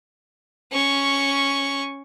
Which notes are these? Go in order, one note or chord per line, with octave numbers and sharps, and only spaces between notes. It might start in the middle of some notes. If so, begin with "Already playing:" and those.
C#4 C#6